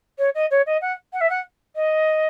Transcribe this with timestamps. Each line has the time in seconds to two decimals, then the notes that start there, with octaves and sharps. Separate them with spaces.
0.19 C#5
0.35 D#5
0.51 C#5
0.67 D#5
0.81 F#5
1.13 F#5
1.21 E5
1.30 F#5
1.76 D#5